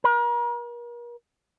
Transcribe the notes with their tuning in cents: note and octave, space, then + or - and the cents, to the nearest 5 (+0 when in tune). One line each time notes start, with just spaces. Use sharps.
A#4 +40